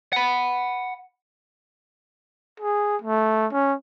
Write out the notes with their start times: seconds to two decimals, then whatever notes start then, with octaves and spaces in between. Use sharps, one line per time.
0.13 F#5 B5
2.60 G#4
3.02 A3
3.52 C#4